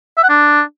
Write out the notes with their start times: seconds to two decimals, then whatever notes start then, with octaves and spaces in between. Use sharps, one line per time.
0.18 E5
0.24 F#5
0.30 D4